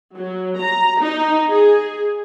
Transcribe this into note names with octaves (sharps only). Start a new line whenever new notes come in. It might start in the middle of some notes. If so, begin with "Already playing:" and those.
F#3
A#5
D#4
G#4